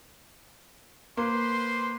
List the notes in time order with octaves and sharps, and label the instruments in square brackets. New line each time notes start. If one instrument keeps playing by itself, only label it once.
[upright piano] A#3 [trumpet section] B4 C5 C6